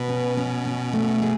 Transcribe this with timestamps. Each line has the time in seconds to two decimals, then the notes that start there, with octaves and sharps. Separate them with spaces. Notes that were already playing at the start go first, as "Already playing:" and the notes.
Already playing: B2 B4
0.09 C#4
0.37 C#4
0.65 C#4
0.93 A3
1.22 G#4